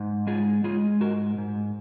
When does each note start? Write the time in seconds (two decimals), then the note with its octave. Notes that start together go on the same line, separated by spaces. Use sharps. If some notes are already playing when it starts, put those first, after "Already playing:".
Already playing: G#2
0.27 G#3 F4 G#4
0.64 G#3 F4 G#4
1.01 G#2 F#4 A#4
1.38 G#2